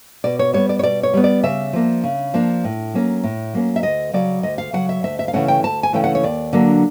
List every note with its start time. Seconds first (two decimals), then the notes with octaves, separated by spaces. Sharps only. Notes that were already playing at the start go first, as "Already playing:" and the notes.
0.24 B2 D5
0.39 C#5
0.53 G3 B3 C#5
0.69 D5
0.79 C#5
0.83 B2 D5
1.03 C#5
1.14 G3 B3
1.24 D5
1.43 C#3 E5
1.73 F3 A#3 D4
2.04 C#3
2.34 F3 A#3 D4
2.64 A2
2.94 F#3 A#3 C#4
3.24 A2
3.54 F#3 A#3 C#4
3.76 E5
3.83 D2 D#5
4.13 C#3 F#3 D5
4.43 D2 D#5
4.58 F5
4.73 C#3 F#3 F#5
4.89 E5
5.03 D2 E5
5.19 E5
5.28 F5
5.33 C#3 E3 A3 C#4 F#5
5.48 G5
5.63 D2 A5
5.83 G#5
5.93 C#3 E3 A3 C#4 G5
6.04 F#5
6.15 C#5
6.23 D#2 D5
6.53 D3 F#3 A#3 D4